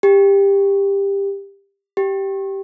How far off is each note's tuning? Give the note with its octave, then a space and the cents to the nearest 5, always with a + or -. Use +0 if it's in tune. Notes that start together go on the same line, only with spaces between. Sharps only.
G4 +15
G4 -10